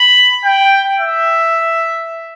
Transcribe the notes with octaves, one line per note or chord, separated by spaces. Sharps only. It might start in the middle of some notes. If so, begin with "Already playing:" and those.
Already playing: B5
G5
E5